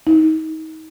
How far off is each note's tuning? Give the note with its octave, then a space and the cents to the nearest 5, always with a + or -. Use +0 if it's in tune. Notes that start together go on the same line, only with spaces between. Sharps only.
D#4 +30